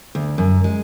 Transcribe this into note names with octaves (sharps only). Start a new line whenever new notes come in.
D2
F#2
G#3